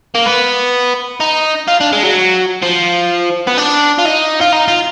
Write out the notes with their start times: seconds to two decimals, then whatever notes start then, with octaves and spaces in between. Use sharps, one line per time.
0.15 A#3
0.26 B3
1.21 D#4
1.68 F4
1.81 D4
1.93 G#3
2.03 F#3
2.63 F3
3.47 B3
3.58 D4
3.99 F4
4.06 D#4
4.41 F4
4.53 D#4
4.68 F4